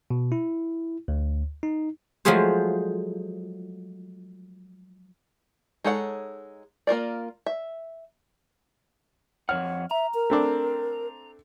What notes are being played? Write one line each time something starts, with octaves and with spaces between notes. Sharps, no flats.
B2
E4
D2
D#4
F3 F#3 G#3 A3 G#4 C5
G#3 D#4 A4 C#5 F#5
A#3 F4 A#4 D5
E5
F2 C#5 F#5 F6
E5 A#5
A#4
A3 C4 D4